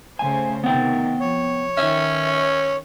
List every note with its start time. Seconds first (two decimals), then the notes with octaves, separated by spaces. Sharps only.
0.19 C#3 A3 C5 G#5
0.64 C3 D#3 B3 G5
1.20 F3 C#5
1.77 D#3 C#4 E5